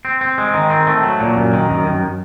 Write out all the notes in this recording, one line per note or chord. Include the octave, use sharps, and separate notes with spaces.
C4
C4
G#3
D#3
C4
A3
F#3
A#2
F#2
D#3
F#2
F#2